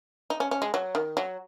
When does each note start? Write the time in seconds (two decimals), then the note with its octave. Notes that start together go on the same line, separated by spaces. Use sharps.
0.30 D#4
0.40 C#4
0.51 C#4
0.62 G#3
0.74 F#3
0.95 D#3
1.17 F#3